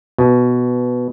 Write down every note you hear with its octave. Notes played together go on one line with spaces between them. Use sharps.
B2